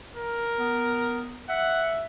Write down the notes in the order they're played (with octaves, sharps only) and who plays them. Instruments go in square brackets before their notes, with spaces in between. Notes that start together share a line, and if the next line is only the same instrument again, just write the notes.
[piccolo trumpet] A#4
[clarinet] B3
[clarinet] E5 [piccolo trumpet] F#5